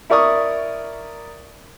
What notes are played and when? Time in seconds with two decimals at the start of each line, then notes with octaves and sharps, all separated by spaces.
0.10 E4 A#4 D5 C#6 D#6